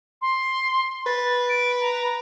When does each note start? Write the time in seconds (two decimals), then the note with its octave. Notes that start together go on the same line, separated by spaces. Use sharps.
0.22 C6
1.06 B4 A6
1.49 D7
1.81 A#5